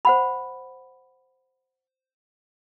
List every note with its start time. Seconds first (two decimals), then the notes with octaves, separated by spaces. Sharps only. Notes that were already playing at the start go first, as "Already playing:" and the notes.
0.05 C5 F#5 B5